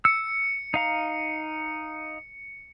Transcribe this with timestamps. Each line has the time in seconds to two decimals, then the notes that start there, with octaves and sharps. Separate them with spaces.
0.05 E6 C#7
0.74 D#4 F5 A#5